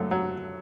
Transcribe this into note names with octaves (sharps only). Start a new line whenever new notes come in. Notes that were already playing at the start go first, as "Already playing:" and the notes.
Already playing: F#2 F#3 A3 A4
F#3